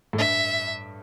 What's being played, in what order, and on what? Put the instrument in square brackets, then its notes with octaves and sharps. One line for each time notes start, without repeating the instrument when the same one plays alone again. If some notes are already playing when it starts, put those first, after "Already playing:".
[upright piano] A2
[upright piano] G2 [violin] E5